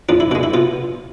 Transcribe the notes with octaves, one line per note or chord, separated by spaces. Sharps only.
E2 D4 F4
E4
B2 G#3 D4
E4
B2 F4